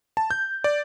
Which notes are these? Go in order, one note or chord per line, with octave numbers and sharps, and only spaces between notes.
A5
G6
D5